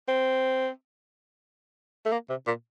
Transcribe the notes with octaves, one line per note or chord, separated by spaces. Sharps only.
C4
A3
A#3
C3
A#2